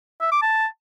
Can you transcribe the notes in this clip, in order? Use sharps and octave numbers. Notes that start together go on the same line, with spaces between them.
E5
D6
A5